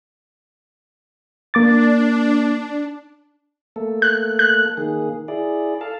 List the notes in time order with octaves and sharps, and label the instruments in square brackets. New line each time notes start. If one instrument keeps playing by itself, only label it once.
[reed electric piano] A#3 D6 A6 [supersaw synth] D4
[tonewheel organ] A3 A#3 A4
[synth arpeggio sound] F#6
F#6
[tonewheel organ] D#3 A#3 G#4
E4 G#4 D5
A4 F5 A5